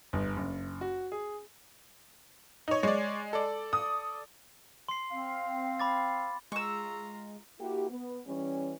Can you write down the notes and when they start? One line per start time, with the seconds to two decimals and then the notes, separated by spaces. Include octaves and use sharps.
0.13 G1
0.36 F#1
0.81 F#4
1.12 G#4
2.68 D#4 C#5
2.83 G#3 C#5 D5
3.33 A4 D5
3.73 D#6
4.89 C6 C7
5.11 C4 F5
5.79 B5 D6 A6
6.52 G#3 F4 A#5 C#6 E6
7.60 A#3 E4 F#4 G4
7.90 B3
8.27 E3 G3 C#4